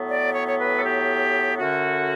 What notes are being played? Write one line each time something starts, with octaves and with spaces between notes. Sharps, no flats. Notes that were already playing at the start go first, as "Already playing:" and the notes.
Already playing: A2 F#3 B3
D5
C#5
C#5
B4
A4
G4
F#2 D3 A3 C#4 F#4